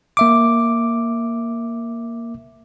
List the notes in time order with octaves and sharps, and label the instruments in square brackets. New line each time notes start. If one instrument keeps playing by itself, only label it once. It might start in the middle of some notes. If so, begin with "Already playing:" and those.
[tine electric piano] A#3 E5 D6